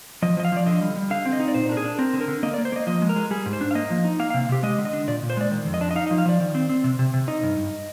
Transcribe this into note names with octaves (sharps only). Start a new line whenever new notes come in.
F3 D#5
F3 D#5
F5
F3 D5
D3 D#5
G3
G3
D3 F5
C4
D#5
D#4
D5
A#2 C5
D4 A#4
G#4
D4
C4 A#4
D3
A#4
D3
A#3 D#5
D5
A#3
C5
A#3 D#5
F3 D#5
G#3
A#4
G#3
G3 G#4
G#2
C5
D4
F5
A#3 D#5
F3
D#4
A#3 F5
F5
C3
C3 G4
G#3 D#5
D3
D#5
D4
A#2 D5
A#2
C5
G#3 D5
D#3
F2
D#5
D4
D#5
D#4 F5
D#5
F3
F5
F3 D5
D#3
C4
C4
C3
C3
C3
D#4 D#5
G2
G2